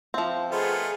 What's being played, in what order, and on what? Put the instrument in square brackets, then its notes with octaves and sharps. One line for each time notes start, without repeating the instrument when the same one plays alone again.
[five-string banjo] F3 C4 [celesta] E5 F5
[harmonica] A3 B3 F4 [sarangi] G#4 [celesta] C5 D#5 A#5